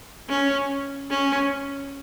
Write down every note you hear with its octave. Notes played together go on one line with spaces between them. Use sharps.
C#4
C#4